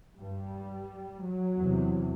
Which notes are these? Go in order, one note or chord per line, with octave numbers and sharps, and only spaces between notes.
G2 G3
F#3
E2 C3